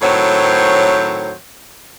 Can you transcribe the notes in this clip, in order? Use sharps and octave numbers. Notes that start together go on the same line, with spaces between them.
A2 D#3 F#3 C4 C5 C#5